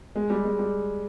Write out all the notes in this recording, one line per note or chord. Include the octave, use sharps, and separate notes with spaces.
G#3
G3
G#3
G3